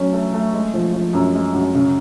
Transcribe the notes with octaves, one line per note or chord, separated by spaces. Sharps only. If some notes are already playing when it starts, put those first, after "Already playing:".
Already playing: F#3 A3 C#4
A3
A3
G#3
F3
F3
F#2
G#3
F#2
C#3